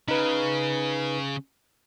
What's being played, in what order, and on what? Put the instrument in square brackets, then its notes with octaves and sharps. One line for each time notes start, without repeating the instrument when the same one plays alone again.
[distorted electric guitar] C#3 [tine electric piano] D#4 B4